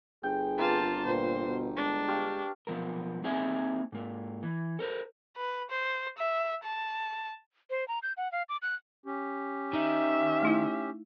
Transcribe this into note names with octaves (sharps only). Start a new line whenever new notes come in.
G1 G#4 G5
A#3 C4 F4 B4 A5
A#2 C5
B2
G#3 D4
G4 F5 C#6
B1 F3 B3 A#4
A#3 C4 D#4 G#4 E5 G#5
G#2 A#3
E3
A4 A#4 C5
B4
C5
E5
A5
C5
A#5
G6
F#5
F5
D6
F#6
C#4 G4
D#3 E5
A3 D#4 E4